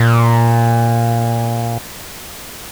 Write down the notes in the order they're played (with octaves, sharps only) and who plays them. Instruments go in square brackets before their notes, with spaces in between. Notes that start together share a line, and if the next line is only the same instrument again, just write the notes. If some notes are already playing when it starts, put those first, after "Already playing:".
Already playing: [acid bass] A#2